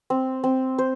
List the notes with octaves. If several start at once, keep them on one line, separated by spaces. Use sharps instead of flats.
C4
C4
C5